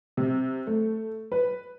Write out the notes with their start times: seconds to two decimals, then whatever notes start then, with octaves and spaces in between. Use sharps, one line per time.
0.17 C3
0.67 A3
1.32 B4